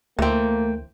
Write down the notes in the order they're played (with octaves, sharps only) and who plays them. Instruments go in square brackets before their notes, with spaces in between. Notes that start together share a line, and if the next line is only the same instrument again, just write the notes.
[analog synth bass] D2 [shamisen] E3 C4 [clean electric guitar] A3 G5 [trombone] A#3